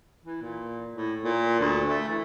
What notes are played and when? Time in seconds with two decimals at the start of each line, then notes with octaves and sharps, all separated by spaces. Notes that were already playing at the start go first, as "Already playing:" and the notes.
0.25 E3
0.42 A#2
0.95 A2
1.24 A#2
1.59 D2
1.89 A3
2.09 E3